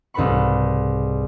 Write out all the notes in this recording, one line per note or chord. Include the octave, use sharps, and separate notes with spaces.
C2 G#2 A4 B4 B5 C#6